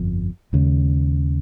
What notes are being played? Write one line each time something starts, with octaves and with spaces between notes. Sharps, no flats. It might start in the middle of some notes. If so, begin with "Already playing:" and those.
Already playing: G1 F2 F3
D#2 C#3 G#3